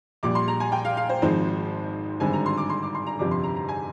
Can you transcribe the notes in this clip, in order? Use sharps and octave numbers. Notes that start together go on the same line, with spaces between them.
A#1 A#2 G3 D6
C6
A#5
G#5
G5
F5
F5
C5
G#1 G#2 F3 G#3 C4
G#1 G2 D3 G#3 C4 G#5
A#5
C6
D6
C6
D6
C6
A#5
G1 F2 C3 F3 D6
C6
A#5
A#5
G#5